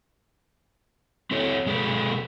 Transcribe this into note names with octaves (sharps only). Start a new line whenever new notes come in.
C4 E4 A4 C#5
B2 G#3 G#4 A4 B4